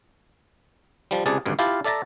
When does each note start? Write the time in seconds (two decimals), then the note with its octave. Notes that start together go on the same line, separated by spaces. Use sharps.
1.11 F3 G3
1.26 C#2 C3 G#4 D5 A5
1.46 G#1 D2 G2
1.59 E4 F4 G4 F5 A5
1.84 A4 D5 E5 A5 A#5